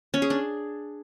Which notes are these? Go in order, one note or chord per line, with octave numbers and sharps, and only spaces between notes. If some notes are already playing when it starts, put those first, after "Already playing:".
C#4
G#4
D4